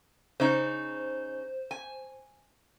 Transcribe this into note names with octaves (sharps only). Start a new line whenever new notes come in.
C#3 D#4 C5
G#5